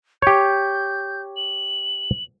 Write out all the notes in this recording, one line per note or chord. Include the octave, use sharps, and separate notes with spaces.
G4 C#5 G6
F#7